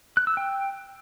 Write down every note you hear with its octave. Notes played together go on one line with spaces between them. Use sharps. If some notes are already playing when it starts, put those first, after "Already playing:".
F#6
E6
G5